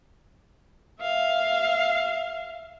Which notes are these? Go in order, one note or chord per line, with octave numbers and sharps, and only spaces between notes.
E5 F5